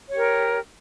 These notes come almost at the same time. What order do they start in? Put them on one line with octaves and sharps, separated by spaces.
C#5 G4 A#4